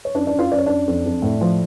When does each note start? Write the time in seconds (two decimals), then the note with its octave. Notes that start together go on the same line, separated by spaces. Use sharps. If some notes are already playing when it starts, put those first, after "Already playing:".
0.05 C#5
0.15 F#2 D4 D5
0.27 D4 D5
0.33 F#2
0.39 F4 F5
0.51 F#2 D5
0.58 C#5
0.66 F#2 D4 D5
0.88 F2
1.06 F2
1.22 A2
1.41 F3